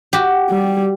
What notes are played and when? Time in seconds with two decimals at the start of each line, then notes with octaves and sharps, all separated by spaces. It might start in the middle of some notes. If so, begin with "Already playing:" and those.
0.13 F#4 G4
0.49 G3